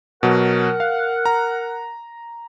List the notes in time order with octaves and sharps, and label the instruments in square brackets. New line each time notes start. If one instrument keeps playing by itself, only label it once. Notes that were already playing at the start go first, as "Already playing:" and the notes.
[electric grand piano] B2 F#3 [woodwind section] A#4 F#5
[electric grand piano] F5
A#5